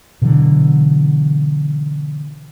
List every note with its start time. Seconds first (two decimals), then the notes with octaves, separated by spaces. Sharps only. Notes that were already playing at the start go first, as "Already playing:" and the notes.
0.22 B2 D3 E3 F#3